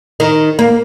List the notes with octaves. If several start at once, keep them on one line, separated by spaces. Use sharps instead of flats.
D#3
A#3